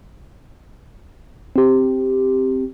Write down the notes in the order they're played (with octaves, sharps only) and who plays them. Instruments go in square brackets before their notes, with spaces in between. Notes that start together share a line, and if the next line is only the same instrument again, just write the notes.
[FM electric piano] C4 G4